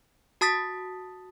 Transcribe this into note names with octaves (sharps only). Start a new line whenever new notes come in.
F#4 A5 D#6 A6 B6